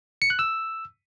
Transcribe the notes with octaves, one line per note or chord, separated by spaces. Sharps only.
C#7
F#6
E6